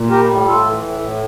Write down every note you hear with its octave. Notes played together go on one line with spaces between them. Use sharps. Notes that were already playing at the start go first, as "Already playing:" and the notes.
Already playing: A#2
G3 G4 A#4
A2
A2 F4 A4
E3
A2
A2